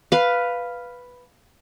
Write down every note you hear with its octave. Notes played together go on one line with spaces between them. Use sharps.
B4 F5